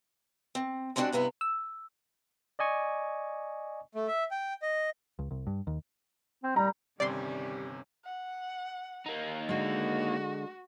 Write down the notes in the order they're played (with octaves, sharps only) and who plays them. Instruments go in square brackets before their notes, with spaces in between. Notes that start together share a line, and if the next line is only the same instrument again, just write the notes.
[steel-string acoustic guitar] C4
G#3 B3 C4 D4 F#4 G4
G2 C3 B3 E4
[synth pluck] E6
[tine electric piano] D5 D#5 G#5 C#6
[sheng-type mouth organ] A3
E5
G5
D#5
[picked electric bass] C#2
C2
G2
D#2
[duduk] C4
[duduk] G3 [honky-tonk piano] A#5
[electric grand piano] G1 C3 [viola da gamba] D#3 C#4 [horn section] G3 [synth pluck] D5 C6
[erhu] F#5
[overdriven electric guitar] A#3 D#4
[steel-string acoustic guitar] D3 G#3 [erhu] F#4